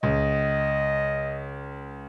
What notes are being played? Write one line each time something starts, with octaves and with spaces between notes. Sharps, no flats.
C#2 D#5